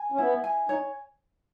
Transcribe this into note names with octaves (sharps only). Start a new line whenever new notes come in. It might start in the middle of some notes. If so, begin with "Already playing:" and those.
Already playing: G#5
C#4
B3 E4
G#5
D#4 C#5